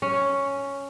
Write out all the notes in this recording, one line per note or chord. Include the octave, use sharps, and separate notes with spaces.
C#4